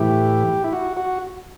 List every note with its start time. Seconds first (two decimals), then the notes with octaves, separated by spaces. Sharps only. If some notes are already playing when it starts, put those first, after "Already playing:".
Already playing: A2 E3 G4
0.64 E4
0.73 F#4
0.97 F#4